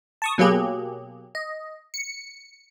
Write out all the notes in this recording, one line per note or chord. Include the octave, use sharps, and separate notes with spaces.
A5 C#6 D#6
B2 F#3 A#3 G4 G#4
D#5
C#7